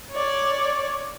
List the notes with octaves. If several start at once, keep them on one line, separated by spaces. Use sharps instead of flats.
C#5 D5